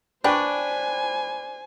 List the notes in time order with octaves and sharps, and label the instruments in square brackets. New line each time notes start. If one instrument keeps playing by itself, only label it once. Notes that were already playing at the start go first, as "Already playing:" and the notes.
[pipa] D4 [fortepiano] B4 G5 C#6 [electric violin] C5 G#5